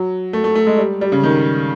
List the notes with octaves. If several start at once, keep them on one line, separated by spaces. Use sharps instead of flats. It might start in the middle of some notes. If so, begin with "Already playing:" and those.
Already playing: F#3
A3
A3
A3
G#3
G3
G3
C#3
D#3